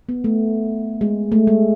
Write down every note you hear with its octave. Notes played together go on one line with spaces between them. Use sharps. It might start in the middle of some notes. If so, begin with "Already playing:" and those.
B3
A3
G#3
A3
G#3